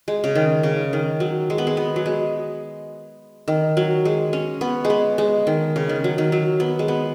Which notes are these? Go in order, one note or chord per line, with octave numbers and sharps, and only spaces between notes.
G#3
C#3
D#3
C#3
D#3
F#3
G#3
B3
G#3
B3
F#3
G#3
D#3
F#3
G#3
C#4
B3
G#3
B3
G#3
D#3
C#3
D#3
F#3
D#3
F#3
B3
G#3
B3